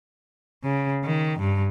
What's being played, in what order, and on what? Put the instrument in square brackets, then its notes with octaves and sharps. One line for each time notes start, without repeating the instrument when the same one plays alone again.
[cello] C#3
D#3
G2